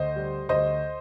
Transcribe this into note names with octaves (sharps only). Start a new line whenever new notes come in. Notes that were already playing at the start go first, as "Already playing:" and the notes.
Already playing: D2 C5 D#5
G3
D2 C5 D#5